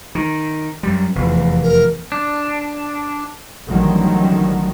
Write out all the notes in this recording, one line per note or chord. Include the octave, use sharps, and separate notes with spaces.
D#3
F#2 G3
F1 E2
A#4
D4
A1 A2 D3 D#3 F#3 G3